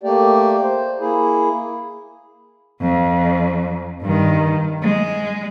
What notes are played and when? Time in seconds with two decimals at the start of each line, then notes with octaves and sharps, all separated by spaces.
0.03 A3 A#3 G4 D5
0.63 C5
1.00 A#3 E4 G#4
2.81 F2
4.02 G2 D#3
4.82 G#3